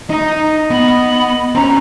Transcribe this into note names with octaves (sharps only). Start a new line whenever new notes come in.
D#4 D#5 A#5
B3 B5
C4 C#4 A#5